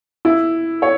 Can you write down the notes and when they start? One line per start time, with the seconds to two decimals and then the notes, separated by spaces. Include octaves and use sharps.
0.25 E4
0.82 C#5